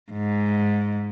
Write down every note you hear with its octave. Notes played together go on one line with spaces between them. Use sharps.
G#2